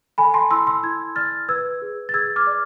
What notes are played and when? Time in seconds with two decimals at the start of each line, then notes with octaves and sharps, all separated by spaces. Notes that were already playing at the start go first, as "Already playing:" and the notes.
0.18 A4 G#5 B5
0.34 A5 C6
0.51 E4 C6 E6
0.67 C6 E6
0.83 E4 E6 G#6
1.16 D5 F6 A6
1.49 B4 E6 G#6
1.82 G#4
2.09 A6
2.14 G#4 E6 G#6
2.36 D6 F6
2.47 D5